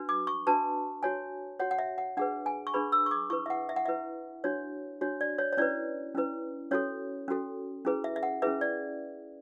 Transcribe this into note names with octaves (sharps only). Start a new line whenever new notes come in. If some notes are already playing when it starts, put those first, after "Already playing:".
Already playing: D4 F#4 B4
D6
C#6
D4 F#4 B4 A5
F#4 C#5 G#5
F#4 C#5 F#5
F#5
E5
F#5
D4 G#4 B4 F#5
G#5
C#6
D4 G#4 B4 B5
E6
C#6
D6
E4 B4 C#6
E5
F#5
E5
F#5
E4 B4 E5
D4 F#4 C#5
D4 F#4 C#5
D5
C#5
C#5
C#4 E4 B4 D5
C#4 E4 B4
C#4 F#4 A4 C#5
C#4 F#4 A4
C#4 E4 G#4 B4
E5
E5
F#5
C#4 E4 G#4 B4 E5
D5